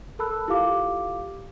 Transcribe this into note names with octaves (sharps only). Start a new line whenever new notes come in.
A4 A#4 A5 B5 E6 F#6
E4 F4 G4 A4 F5 D6